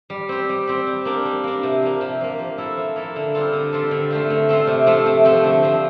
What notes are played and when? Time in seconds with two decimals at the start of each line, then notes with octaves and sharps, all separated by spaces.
0.10 G3
0.29 C4 G4
0.49 G3
0.67 C4 G4
0.87 G3
1.05 A#3 D4
1.25 G3
1.44 A#3 D4
1.63 C3
1.82 F3 A#3
2.01 C3
2.21 F3 A#3
2.39 F3
2.58 A#3 E4 A4
2.77 F3
2.96 A#3 E4 A4
3.16 D3
3.34 G3 C4 F4 A4
3.53 D3
3.73 G3 C4 F4 A4
3.91 D3
4.10 A3 C4 F4
4.30 D3
4.49 A3 C4 F4
4.67 C3
4.86 F3 A3 C4
5.06 C3
5.25 F3 A3 C4
5.44 D3
5.63 F3 C4